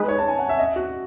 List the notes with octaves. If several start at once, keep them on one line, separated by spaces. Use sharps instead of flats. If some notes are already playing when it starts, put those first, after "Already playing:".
Already playing: G#3 D#4 G#4 B4
C#5
A5
G#5
F#5
E5
D#5
F#4